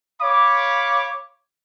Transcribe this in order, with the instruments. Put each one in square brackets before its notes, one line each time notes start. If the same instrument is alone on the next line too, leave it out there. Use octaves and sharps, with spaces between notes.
[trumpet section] C#5 F5 B5 D6